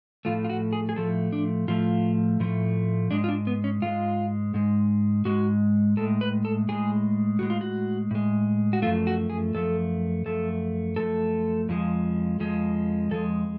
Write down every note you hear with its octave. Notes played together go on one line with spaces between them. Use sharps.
A2 F3 A3 F4
F4
F#4
G#4
G#4
A2 F3 A3 A4
D4
A2 F3 A3 F4
A2 F3 A3
G#2 G#3 D4
F4
D4
B3
C#4
G#2 G#3 F4
G#2 G#3
G#2 G#3 F#4
A2 G#3 A4
B4
A4
A2 G#3 G#4
A2 G#3 F#4
F4
F#4
A2 G#3
F#4
F#2 F3 A3 F4
F#4
G#4
F#2 F3 A3 A4
F#2 F3 A3 A4
F#2 F3 A3 A4
F2 F3 G#3
F2 F3 G#3
F2 F3 G#3 A4